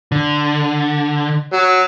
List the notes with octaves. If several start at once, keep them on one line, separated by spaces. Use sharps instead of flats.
D3
F#3